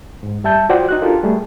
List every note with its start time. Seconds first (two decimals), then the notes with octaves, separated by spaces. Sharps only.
0.23 G#2
0.44 F#2 G3 E5 A5 G6
0.69 F4 F#4 C5 D5 F#5 G5
0.89 D#4 F#4 F#6
1.02 D4 F4 G4 A4 A#4
1.23 G3 A3 G#4